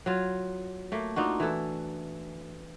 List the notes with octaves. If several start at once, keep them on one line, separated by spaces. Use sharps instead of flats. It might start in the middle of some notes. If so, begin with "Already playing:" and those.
F#3 F4
A3 A#3
D4 D#4 F4 F#4
E3 A4